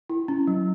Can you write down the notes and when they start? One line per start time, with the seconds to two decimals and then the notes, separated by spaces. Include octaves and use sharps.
0.10 E4
0.28 C#4
0.47 F#3